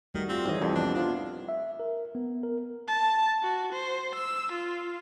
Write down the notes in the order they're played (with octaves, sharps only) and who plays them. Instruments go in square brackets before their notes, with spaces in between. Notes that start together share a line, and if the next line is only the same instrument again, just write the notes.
[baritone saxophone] D#3 [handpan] G3 A3 F#4
[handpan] A3 G4 [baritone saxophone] C4 [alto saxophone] F4
[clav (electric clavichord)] G#1 D#5 [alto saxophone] E3 [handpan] G3 D#4 C#5
[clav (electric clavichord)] C2 F2 [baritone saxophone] C3
[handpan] B3 [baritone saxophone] D4
[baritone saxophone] D4 [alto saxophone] F4
[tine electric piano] E5
A#4
B3
A#4
[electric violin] A5
F#4
C5
E6
F4